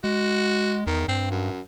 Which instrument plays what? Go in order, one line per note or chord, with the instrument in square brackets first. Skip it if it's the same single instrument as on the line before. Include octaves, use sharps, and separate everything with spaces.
[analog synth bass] G#3 [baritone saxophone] F#4
[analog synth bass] E2 [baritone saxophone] D#3
[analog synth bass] G2 [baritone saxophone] C4
[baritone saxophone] F#2